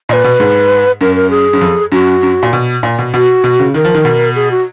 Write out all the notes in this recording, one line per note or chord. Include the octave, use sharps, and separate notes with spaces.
A#2 B4 D#5
B2
G#2
F#2 A#4
A#4
G#4
F#2
F2
F#2 F#4
F#2
A#2
B2
A#2
B2
B2 F#4
B2
C#3
D#3 A#4
F3
D#3
B2
G#4
F#4